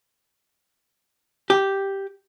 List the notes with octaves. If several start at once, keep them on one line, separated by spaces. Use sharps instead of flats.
G4